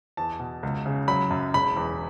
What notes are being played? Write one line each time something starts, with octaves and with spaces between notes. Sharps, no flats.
E2 A5
B2
C#2
C#3
F#3 B5
F#2
E1 B5
E2